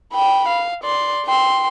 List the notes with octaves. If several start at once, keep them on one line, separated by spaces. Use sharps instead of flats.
G5 B5
F5
D5 C6
G5 C6